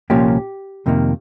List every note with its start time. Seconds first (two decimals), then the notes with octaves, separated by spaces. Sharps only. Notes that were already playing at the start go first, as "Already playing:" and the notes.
0.10 C2 A#2 F3 A#3 C#4 G4
0.86 F2 C3 D#3 A#3